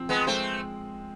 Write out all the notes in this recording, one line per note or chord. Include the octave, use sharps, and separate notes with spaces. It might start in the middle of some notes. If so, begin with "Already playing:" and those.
Already playing: F3 C4
G#3 B3
G#3 A3 C4